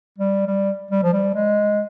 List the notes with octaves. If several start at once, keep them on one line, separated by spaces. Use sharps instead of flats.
G3
G3
G3
F3
G3
G#3